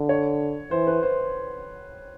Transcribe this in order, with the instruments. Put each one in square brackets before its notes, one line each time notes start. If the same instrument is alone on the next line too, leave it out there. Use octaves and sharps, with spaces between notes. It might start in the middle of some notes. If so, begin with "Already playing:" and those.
Already playing: [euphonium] D3
[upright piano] C#5
[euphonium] E3 [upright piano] C5
[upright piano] B4
C5